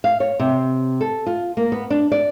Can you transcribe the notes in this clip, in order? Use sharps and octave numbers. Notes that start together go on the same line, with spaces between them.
F5
C#5
C3
A4
F4
A#3
B3
D4
D5